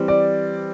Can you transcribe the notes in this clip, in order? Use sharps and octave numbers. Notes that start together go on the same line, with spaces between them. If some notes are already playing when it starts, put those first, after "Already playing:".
Already playing: E3 G3 C4
D5